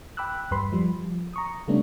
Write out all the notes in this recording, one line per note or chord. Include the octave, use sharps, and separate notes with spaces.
G5 B5 D6 E6 F#6
E2 G2 G3 B4 B5 C6
F3 G3
F3
A#5 C#6 D#6
C#3 G3 A3 B3 C#4 D4